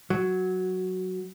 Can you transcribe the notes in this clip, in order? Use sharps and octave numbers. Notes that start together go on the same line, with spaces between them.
F#3